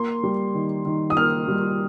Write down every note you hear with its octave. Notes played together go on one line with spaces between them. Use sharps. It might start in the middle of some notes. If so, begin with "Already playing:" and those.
Already playing: A#3 C6
G3
D#3
D#3
D#6
A#3 F6
G3